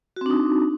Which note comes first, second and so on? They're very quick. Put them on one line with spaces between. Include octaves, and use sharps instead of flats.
F#4 C4 D4 D#4